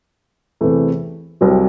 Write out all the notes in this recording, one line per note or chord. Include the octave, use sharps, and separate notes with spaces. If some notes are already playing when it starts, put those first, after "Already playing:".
E2 C3 E3 A3
C2 C3 F#3